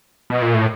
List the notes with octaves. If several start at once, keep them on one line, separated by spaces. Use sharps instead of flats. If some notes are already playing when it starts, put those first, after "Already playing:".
B2
A#2
A2